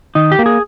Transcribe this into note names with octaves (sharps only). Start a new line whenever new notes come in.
D#3 D#4
G4
A#3
G#4